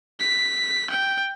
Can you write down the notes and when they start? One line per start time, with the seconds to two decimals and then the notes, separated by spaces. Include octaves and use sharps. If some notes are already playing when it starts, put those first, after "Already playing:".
0.20 B6
0.90 G5